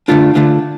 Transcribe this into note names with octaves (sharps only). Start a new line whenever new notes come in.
D3 A3 D4 F4
D3 A3 D4 F4